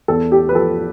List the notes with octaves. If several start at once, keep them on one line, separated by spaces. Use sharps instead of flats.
E2 A4
G4
B4
F3 A4